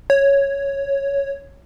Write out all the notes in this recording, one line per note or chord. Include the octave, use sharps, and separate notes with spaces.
C#5